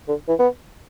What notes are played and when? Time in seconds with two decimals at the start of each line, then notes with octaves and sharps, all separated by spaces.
0.08 D3
0.28 E3
0.39 B3